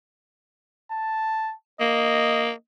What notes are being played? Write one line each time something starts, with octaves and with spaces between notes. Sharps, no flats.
A5
A#3 D#5